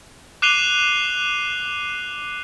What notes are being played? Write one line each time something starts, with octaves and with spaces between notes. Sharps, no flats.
D6 F#6 C7 D#7 F7 G7